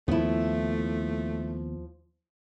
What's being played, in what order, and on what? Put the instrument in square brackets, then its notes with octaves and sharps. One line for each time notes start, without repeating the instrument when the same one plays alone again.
[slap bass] D#2 B3 [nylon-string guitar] F3 E4 [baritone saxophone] A3